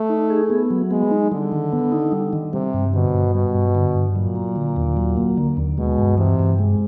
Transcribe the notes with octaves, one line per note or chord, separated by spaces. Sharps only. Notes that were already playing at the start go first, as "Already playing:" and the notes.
Already playing: A3
D#4
G#4
B3
F#3
G#3 B3
D#4
D3 G3
D#3
B3
D#4
G3
D#3
C3 G3
G2
B2 D3
G2
B2 G3
G2
D3
G2
A#2 F#3
A#3
D3
D#2
F#3
A#3
D3
D#2
B2 G#3
G2
C3 E3
G2
G#3